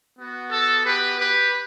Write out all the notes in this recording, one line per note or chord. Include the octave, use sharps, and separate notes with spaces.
B3 F#4
A4
G4 B4
G4 B4